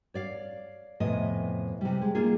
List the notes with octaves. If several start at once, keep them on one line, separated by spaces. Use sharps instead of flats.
C#5 D5 F5
F2 A2 C3 B3 D#5 G#5
C3 G3
G#3
A#3 D4 D#4 F4 G#4